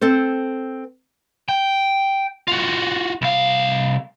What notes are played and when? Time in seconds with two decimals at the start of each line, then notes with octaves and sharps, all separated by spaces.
0.01 C4 A4 C5
1.49 G5
2.48 F4 F#4
3.22 C2 F5